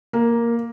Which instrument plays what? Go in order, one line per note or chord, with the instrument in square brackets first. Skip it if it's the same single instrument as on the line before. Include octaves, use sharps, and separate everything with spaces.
[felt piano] A#3